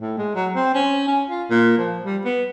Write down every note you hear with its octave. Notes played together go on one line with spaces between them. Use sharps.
A2
G#3
F#3
C4
C#4
C#4
F4
A#2
F3
G3
B3